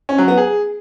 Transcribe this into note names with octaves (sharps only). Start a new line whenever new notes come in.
C#4
F#3
B3
G#4